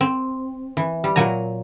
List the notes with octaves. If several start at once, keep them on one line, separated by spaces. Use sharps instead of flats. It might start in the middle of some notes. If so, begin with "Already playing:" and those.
C4
E3
G3
A#2 F#3 G#5 A#5